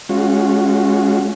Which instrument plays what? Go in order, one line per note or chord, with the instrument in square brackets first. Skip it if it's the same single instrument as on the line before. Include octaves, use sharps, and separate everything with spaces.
[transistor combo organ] G#3 C#4 F4 F#4